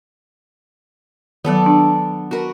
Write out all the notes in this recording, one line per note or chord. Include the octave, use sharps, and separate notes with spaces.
D#3 F#3 B3 A4 D5
D4
F#4 A#4 B4